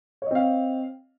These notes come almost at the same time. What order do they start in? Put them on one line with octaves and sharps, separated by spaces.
C#5 D#5 C4 F5